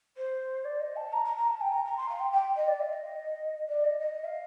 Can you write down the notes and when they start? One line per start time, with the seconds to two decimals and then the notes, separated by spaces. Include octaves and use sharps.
0.17 C5
0.64 D5
0.80 D#5
0.96 A5
1.12 A#5
1.25 A#5
1.36 A#5
1.48 A5
1.60 G5
1.72 A#5
1.85 A#5
1.97 C6
2.09 F5
2.19 G5
2.32 G5
2.56 D#5
2.67 D5
2.80 F5
2.92 D#5
3.68 D5
3.84 D#5
4.00 D#5
4.24 F5